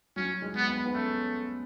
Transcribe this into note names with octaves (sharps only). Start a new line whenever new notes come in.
F#3 C#4
G#3
B3
B3
B3
A3 C#4